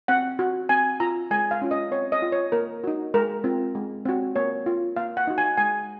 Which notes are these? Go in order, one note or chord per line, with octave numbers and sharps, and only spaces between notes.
C4 F#5
F#4
C4 G#5
F4 A#5
G#3 G#5
F5
C#4 F4
D#5
C4 C#5
D#5
F4
C#5
A#3 A#4
D#4 F#4
G#3 A#4
C4 F4
G#3
C4 F#4
A#3 C#5
F4
A#3 F5
F#5
D#4 F#4
G#5
G#3 G#5